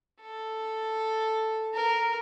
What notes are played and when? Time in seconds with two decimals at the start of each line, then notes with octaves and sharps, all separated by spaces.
0.21 A4
1.74 A#4